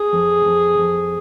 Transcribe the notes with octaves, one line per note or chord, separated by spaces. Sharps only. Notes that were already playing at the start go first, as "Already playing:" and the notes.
Already playing: G#4
F2
F2
F2